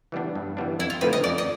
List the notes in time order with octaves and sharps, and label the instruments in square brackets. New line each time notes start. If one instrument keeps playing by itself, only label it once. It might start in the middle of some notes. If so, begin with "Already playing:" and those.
[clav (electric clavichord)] E3 G3 B3 D4
G2
E3 G3 B3 D4
[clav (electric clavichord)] F2 [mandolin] E4
[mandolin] F4
[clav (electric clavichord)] D3 F3 A3 C4 [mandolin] B4
[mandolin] D#5
[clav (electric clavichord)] F2 [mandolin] D5
[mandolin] D#5